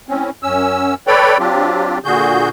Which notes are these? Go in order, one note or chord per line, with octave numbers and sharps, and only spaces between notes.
A2 C4 C#4
F#2 C#4 E6
A4 B4 C#5 D5 G5 B5
F#3 C4 D4 F4 G4
A#2 D3 F#4 G#4 G6